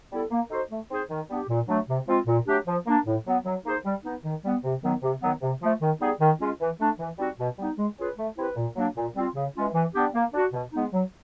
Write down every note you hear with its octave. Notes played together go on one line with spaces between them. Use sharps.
G3 B3 E4 A4
A#3
D#4 F#4 A4 C5
A3
C4 D#4 G#4 C5
D#3
G3 B3 D4 G4
A#2
F#3 A3 D4
C3
F3 G#3 C4 F4
A#2
F#3 A3 D4 G4
F3
A#3 D4
A2
F#3 B3
F#3
A#3 D#4 G#4 C5
G3
B3 D#4
D#3
G3 B3
C3
D#3 F#3 B3
C3
D#3 F#3 B3
C3
F3 A3
D#3
G3 B3 D#4 G#4
D#3
G#3 C#4 F4
E3
A3 D4
E3
G3 C4 D#4 F#4
B2
G3 B3 D#4
G#3
C#4 F4 G#4 B4
A3
C4 E4 G4 B4
A#2
F#3 A#3 D4
A#2
G3 C4 F4
C#3
E3 G#3 C#4 F4
E3
G3 B3 D4 G4
A#3
D4 F#4
B2
G#3 B3 D#4
F#3